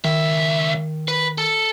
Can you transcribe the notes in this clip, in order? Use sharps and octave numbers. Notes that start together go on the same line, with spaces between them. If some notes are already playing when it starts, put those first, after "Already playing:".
C#2 D#3 E5
B4
A4